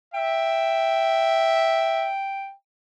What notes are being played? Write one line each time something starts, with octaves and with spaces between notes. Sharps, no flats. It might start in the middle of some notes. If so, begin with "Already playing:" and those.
E5 G5